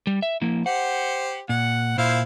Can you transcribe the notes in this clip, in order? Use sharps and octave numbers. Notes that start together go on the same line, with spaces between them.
G3
E5
F3 A#3 E4
G4 C5 F#5
A#2 F#5
A#2 E4 C5 F5